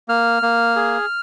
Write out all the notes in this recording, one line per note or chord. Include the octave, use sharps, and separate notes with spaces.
A#3 F6
A#3
G#4